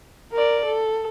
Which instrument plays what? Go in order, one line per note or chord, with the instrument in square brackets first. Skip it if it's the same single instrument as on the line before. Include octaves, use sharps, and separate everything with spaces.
[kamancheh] A#4 D5
A4